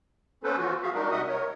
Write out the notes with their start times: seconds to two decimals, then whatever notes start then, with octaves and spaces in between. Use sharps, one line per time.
0.44 A#3 B3 C#4 A4 B4 C5
0.58 E3 F3 F4 F#4
0.82 F#4 G#4 E5 F5
0.94 G3 G#3 D4 D#4 F#4 A#4
1.11 C3 D#5 E5 F#5 D#6
1.28 A#4 C#5